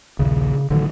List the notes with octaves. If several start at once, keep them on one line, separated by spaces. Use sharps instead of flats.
A#1 D#2 C#3
A1 D3 D#3 F#3